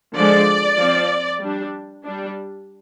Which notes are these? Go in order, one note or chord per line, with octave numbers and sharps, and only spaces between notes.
D3 F3 G#3 D5
F3 C4
G3 D4
G3 D4